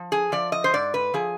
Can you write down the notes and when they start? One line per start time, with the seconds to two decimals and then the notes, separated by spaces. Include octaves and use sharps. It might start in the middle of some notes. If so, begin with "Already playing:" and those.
Already playing: F3
0.12 G#4
0.32 F3 D5
0.52 D#5
0.64 C5
0.74 G#2 D5
0.94 B4
1.14 F3 G#4